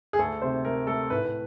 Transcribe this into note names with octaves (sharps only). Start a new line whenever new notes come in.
G#4
D2 A4
C3 C5
A3 A#4
A3 A4
A2 B4
B4